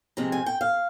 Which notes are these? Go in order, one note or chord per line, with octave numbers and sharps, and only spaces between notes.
C3 F3 G#3 C4 A#5
G#5
G5
F5